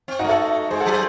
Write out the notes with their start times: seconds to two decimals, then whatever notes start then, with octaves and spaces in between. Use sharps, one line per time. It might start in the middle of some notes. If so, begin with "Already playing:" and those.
0.08 C4
0.19 D#4 F#4
0.24 A3
0.29 F#4 A4
0.71 G#3 G#4 C5
0.80 F#4 A4
0.86 F#3
0.91 G#4 C5